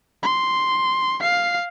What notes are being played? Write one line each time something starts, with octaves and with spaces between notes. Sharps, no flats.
C6
F5 C7